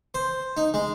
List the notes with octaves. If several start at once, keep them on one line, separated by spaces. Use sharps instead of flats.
C5
D#4
G#3